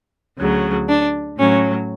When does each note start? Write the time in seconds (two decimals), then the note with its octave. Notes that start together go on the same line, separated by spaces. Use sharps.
0.38 D2 C#3 F#3
0.89 D4
1.38 A2 F#3 C#4